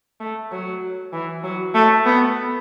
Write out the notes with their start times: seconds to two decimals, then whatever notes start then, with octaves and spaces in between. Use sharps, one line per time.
0.20 A3
0.51 F#3
1.13 E3
1.43 F#3
1.75 A3
2.05 B3